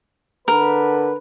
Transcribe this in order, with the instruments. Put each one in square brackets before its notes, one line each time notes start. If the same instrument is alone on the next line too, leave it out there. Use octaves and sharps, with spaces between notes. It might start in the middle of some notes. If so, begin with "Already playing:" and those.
[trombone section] D3 B4 [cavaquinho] A#4